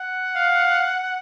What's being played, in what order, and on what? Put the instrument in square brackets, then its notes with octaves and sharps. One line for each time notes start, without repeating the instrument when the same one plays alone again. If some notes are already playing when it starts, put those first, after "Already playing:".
Already playing: [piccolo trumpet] F#5
[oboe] F5